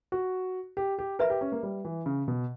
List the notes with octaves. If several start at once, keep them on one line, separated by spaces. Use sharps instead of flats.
F#4
G4
G4
A#4 B4 E5 B5
G4
C#4
A#3
G3
E3
C#3
B2